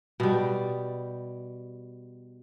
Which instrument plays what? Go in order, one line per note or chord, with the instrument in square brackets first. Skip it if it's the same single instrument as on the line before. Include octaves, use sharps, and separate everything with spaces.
[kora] B2 G3